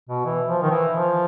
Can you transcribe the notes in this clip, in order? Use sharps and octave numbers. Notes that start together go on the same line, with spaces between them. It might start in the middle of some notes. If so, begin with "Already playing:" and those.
B2
E3
F3
D#3
E3
F3